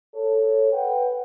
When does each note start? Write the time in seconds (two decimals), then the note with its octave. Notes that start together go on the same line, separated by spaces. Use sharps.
0.15 A4 C#5
0.73 B4 F#5 G5